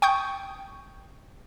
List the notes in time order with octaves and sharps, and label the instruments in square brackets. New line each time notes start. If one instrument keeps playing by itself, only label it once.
[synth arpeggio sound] G5 C#6 D#6 G6